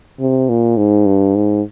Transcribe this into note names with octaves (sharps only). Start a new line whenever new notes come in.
C3
A#2
G#2
G2
G#2